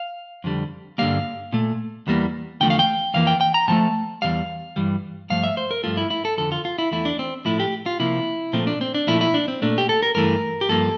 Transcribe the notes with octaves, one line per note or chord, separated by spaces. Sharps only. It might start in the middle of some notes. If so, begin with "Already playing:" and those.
Already playing: F5
F2 D3 G3
G2 D3 G3 A#3 F5
A#2 A3
E2 E3 G3 A#3
E2 D3 F3 A3 G5
F5
G5
F2 E3 A#3 F5
G5
G5
A#5
A2 F3 A3 A5
E2 C3 G3 F5
G2 E3 G3
G2 F3 A3 F5
E5
C5
A#4
G2 F3 A3 F4
E4
E4
A4
F2 D3 F3 A4
F4
F4
E4
E2 E3 A3 E4
D4
C4
A2 F3 A3 E4
G4
F4
C3 F3 A#3 E4
A#2 F3 A3 C4
D4
C4
D4
A#2 F3 A3 E4
E4
D4
C4
A#2 A3 D4
G4
A4
A#4
G2 E3 A3 A#4
G4
G2 F3 A#3 A4